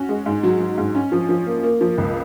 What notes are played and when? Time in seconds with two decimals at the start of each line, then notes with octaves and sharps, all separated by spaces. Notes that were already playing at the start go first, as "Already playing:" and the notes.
Already playing: C#4 F#4
0.09 G#3
0.26 G#2
0.43 F#3
0.60 F#3
0.78 G#2
0.95 C#4
1.12 F3
1.29 F3
1.46 A#3
1.63 A#3
1.81 F3
1.98 C#2